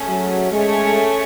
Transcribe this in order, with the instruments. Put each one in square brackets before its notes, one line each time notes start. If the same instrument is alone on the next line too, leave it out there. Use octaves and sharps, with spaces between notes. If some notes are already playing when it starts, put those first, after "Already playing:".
Already playing: [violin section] A3 C#4 G#4
[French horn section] F#3
[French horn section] G#3 [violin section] A3 C#4 G#4 C#5